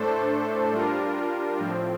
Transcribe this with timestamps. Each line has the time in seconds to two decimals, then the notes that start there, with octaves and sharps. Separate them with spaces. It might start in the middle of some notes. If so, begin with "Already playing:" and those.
Already playing: A2 A3 D4 A4 C5
0.72 G3 D4 F4 A#4
1.59 A2 F3 C4